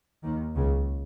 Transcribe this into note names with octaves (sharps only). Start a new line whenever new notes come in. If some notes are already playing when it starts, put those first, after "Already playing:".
D#2 D#3
C#2 C#3